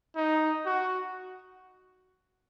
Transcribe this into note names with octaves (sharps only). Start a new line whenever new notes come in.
D#4
F#4